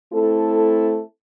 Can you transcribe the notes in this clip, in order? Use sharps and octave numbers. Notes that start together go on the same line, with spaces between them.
A3 C4 E4 A4